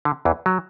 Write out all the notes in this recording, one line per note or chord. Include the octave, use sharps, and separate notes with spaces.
D3
E2 E3
F#3